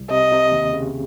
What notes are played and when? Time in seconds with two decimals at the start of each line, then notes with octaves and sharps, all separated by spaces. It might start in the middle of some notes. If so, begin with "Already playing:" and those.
Already playing: C2
0.10 C3 D#5
0.32 C3
0.52 D#2
0.73 C#3